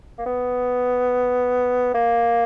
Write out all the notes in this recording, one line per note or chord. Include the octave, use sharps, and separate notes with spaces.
A#3
B3
A#3